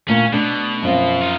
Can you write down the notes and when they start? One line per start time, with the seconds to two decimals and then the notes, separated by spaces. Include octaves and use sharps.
0.09 D2 A#2 C#4
0.33 B2 A3 D4
0.83 F#2 F3 C4
1.21 D#4 F4